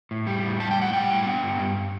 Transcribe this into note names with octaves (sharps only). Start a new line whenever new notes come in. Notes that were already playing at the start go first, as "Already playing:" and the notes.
A2
G3
A2
G3 A5
G5
A2
F#5
G3 G5
A2
B3
G2
G2